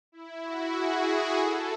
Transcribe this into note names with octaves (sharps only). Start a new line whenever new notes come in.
E4
F#4
G#4
A4